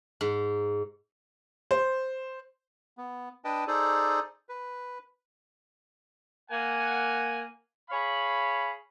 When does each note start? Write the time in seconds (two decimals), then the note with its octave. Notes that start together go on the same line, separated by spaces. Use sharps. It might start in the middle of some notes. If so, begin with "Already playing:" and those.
0.21 G#2
1.71 C5
2.98 B3
3.45 D4 B4 D#5 G5 A5
3.67 D#4 G#4 A4 C5 D5
4.49 B4
6.51 A#3 F#5 G#5
7.90 G#4 C#5 F5 B5